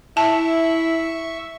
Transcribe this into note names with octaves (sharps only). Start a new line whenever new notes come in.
E4 E5 A5 C#6